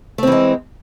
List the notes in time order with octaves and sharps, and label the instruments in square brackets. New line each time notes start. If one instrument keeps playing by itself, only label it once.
[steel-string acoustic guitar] A3
C4
E3
G#3